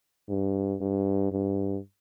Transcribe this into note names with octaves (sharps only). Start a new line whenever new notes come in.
G2
G2
G2